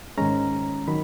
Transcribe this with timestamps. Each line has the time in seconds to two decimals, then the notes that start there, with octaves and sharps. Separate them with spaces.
0.18 G#2 D#3 G#3 C#4 A#5
0.88 D#3 F#3 B5